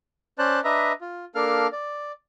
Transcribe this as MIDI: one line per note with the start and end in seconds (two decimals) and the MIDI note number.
0.39 0.60 61
0.39 0.60 72
0.39 0.60 74
0.39 0.60 81
0.39 0.60 90
0.64 0.92 62
0.64 0.92 71
0.64 0.92 75
0.64 0.92 76
0.64 0.92 82
1.01 1.25 65
1.35 1.67 58
1.35 1.67 62
1.35 1.67 69
1.35 1.67 70
1.35 1.67 77
1.35 1.67 89
1.72 2.12 74